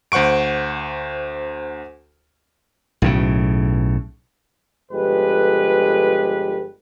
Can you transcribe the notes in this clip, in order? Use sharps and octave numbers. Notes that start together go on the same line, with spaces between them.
D2 C5 F#5 C#6 D7
B1 A2 C#3
G1 F3 G#3 G4 A4 B4